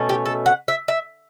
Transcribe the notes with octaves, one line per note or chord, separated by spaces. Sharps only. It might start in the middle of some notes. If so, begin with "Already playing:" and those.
Already playing: B2 A3 C#4
G4
A4
F#5
E5
E5